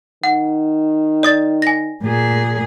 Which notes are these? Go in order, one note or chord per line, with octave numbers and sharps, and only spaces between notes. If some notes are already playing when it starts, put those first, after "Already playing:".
D#3 F#5
D5 D#6 A6
G#5 A#6
A#2 G#4